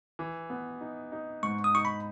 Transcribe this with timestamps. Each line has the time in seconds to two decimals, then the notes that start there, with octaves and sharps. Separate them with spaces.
0.19 E3
0.50 B3
0.81 D#4
1.12 D#4
1.43 G#2 C#6
1.64 D#6
1.74 D#4 C#6
1.85 B5